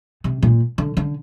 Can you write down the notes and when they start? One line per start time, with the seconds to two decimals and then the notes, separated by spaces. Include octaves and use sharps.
0.24 C3
0.43 A#2
0.78 D3
0.97 D3